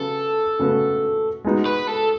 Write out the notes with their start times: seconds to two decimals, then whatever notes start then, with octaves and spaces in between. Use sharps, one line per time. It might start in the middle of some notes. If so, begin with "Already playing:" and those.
Already playing: C#3 F#3 B3 A4
0.59 C#3 F#3 B3 F#4
1.45 G#3 B3 D#4 F#4
1.66 B4
1.87 A4